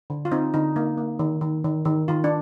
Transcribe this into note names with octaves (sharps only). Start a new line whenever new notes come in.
D3
F4
C4 D#4
D3 D#4
A#3 D#4
A#3
D#3
D#3
D#3
D#3
D#3 F4
D4